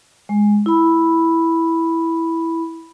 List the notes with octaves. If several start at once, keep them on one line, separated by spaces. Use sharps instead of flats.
G#3
E4 B5